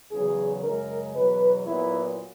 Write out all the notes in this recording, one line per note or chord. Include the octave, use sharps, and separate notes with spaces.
E2 C#3 F#3 G#4
F#2 C#3 G#3 A#4
E2 B2 F#3 B4
A#2 F#3 B3 E4